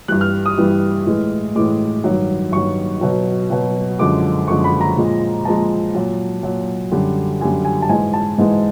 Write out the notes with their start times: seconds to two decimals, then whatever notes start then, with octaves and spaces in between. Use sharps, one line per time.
0.08 G2 E3 G3 F#6
0.21 F6
0.46 D#6
0.58 G2 E3 G3
1.06 A2 E3 G#3
1.55 A2 E3 G#3 D6
2.04 G2 D#3 F#3
2.52 G2 D#3 F#3 C#6
3.01 B2 F#3
3.50 B2 F#3
3.99 F#2 D3 F3 G#3 D6
4.48 F#2 D3 F3 G#3 C#6
4.64 B5
4.81 A#5
4.96 A#2 F3 G#3
5.45 A#2 F3 G#3 A5
5.95 A#2 F#3
6.43 A#2 F#3
6.92 F#2 D3 G3
7.41 F#2 D3 G3 G#5
7.65 G#5
7.82 A5
7.89 G#2 E3 G#3 G#5
8.14 A5
8.38 G#2 E3 G#3